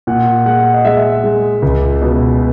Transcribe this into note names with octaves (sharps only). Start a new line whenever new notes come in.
A#2 F#5
G#3 F#5
D#5
G#3 E5
G#3
C#2
B2